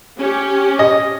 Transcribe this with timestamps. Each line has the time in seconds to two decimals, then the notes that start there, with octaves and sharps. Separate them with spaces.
0.18 C#4 G4
0.79 D#5